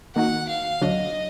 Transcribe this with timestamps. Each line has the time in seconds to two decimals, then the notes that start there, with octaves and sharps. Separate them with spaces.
0.16 D#3 A#3 D#4 F#4 F#5
0.49 F5
0.81 D2 D3 F#3 D4 D#5